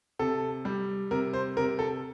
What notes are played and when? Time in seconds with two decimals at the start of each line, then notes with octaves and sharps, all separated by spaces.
0.19 C3 A4
0.65 G3
1.11 C3 A#4
1.33 C5
1.56 C3 A#4
1.79 A4